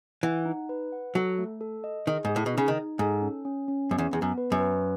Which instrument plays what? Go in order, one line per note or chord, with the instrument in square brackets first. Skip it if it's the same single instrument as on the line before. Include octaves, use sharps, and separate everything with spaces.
[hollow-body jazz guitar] E3 [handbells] F#5
[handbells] D#4
B4
F#5
[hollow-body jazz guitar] F#3 [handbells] A4
[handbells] A3
A4
D#5
[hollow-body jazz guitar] D#3 [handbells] G#4
[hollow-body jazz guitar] G#2 [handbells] G#4
[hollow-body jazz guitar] A2
B2
[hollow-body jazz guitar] C#3 [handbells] D#4
[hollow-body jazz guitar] D#3
[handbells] D#4
[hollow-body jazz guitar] G#2 [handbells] A4
[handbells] C#4
C#4
C#4
[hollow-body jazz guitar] F#2 [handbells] B3
[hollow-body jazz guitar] E2
[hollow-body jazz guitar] E2 [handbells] B3
[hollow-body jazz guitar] F#2
[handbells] B4
[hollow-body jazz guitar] F#2
[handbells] B4